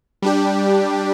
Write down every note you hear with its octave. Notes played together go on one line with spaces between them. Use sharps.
G3 D4 G4